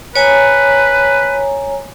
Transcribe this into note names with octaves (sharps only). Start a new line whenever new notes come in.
B4 C#5 G#5 A#5